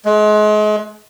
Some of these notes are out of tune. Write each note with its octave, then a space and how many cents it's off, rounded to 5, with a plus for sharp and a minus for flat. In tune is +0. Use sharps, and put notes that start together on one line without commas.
G#3 +35